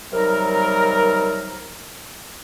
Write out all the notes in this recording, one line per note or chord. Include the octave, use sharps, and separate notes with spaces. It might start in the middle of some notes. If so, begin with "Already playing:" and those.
D#2 C3 F#3 G3 D#4 A#4